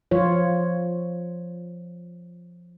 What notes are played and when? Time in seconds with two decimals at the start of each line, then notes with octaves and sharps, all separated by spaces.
0.11 F3 F4 C#5